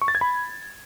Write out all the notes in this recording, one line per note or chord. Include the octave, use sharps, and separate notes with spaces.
C#6
A6
G#6
B5